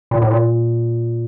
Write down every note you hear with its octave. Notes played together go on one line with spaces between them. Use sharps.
A#2
A2
A#2